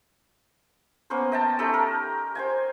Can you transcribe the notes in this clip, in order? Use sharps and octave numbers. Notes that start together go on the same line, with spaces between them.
A#3 B3 C#4 C5
D#5 G5 A5
A3 C#4 D#4 G4
A#4
C5 G5 G#5